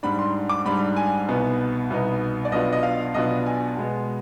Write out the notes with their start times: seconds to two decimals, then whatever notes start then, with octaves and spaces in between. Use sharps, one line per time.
0.03 G#2 G3 D4 B5
0.19 C6
0.49 D6
0.65 G#2 G3 D4 B5
0.97 G#5
1.28 C2 B2 B3 D#4
1.90 C2 B2 B3 D#4
2.45 D5
2.52 B1 B2 B3 D4 F4 D#5
2.72 D#5
2.83 F5
3.14 B1 B2 B3 D4 F4 D#5
3.46 G#5
3.77 B2 G#3 B3